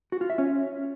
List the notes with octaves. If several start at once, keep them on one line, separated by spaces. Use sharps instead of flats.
F#4
F4
E5
C#4